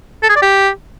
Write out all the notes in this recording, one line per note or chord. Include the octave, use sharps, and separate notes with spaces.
A4
G#4
D5
G4